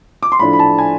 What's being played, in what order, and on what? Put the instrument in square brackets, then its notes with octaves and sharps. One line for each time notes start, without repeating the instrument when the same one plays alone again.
[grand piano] D6
C6
A2 F3 A3 D4 B5
B5
A5
G#5